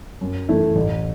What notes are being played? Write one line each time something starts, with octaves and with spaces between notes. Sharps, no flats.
F#2
E3 A3 E4
A1